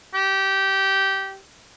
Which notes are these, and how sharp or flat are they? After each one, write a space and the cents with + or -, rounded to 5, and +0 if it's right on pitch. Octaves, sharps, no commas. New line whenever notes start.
G4 -15